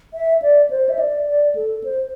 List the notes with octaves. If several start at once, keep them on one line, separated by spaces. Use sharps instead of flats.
E5
D5
C5
E5
D5
D5
A4
C5